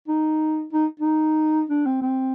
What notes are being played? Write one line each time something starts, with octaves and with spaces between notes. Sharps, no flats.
D#4
D#4
D#4
D4
C4
C4